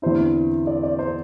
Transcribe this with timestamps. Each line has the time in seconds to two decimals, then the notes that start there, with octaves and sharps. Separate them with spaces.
0.02 E2 D3 C4 E4 C5
0.67 D5
0.83 D5
0.99 C5